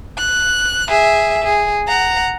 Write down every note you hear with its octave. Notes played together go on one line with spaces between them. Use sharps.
F#6
G#4 E5
G#4
F#5 A#5